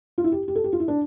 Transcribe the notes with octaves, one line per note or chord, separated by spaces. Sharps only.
F4
E4
G4
G4
A4
G4
F4
E4
D4